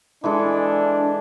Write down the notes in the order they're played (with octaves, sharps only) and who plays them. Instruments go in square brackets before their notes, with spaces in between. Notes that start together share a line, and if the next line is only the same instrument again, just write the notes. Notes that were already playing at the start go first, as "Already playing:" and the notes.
[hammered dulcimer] E3 G#3 A4 [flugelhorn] D4